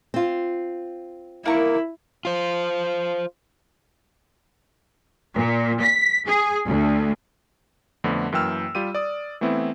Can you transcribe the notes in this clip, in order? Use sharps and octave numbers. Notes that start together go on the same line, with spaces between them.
C4 F4
A#3 E4 A#4 C#6
F4 C5
A#2
B6
G#4
D2
F2 D3 A3 B3
F#2 E3 A#3 G5 E6 F6
G3 F4 G4 D#7
D5 D#6
E3 A3 B3 C4 E4